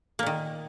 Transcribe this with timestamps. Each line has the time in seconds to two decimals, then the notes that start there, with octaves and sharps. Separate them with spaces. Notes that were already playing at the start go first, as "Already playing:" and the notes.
0.19 A#3
0.23 A#2
0.26 D#3